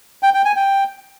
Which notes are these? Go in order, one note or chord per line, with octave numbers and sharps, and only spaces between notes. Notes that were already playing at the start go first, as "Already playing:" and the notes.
G5
G5
G#5
G5